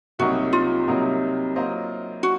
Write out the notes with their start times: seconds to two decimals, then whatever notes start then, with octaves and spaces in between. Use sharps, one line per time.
0.19 C2 C3 F#3 A#3 D#4 F#4
0.53 F4
0.87 C2 C3 F#3 A#3 D#4
1.56 F#3 A#3 F4 C5 D#5
2.23 F#4